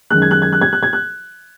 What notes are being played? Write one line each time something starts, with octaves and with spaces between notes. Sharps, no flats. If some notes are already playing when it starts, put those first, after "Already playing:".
F#2 D#3 G#3 F#6
G#6
F#6
G#6
F#6
G#6
F#6
G#6
F#6